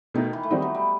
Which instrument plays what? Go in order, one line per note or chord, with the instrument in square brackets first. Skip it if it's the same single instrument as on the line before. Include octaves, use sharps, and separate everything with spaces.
[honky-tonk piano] B2 A3 D#4 [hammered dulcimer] D#3
[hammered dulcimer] E3
A3
[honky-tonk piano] D#3 G3 C4 D#4 [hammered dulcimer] B3
[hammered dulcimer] F#3
G3